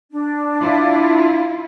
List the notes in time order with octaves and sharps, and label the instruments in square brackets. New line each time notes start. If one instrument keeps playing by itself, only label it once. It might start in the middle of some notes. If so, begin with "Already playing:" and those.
[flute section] D4
[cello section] E4 F4